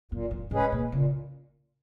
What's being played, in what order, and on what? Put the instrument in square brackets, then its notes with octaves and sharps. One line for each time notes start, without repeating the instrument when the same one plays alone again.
[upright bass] F#2 [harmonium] A#2
[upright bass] F#2
[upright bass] G#2 [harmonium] G#3 C#4 G#4 B4
[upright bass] A#2
[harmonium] A#2 [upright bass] C#3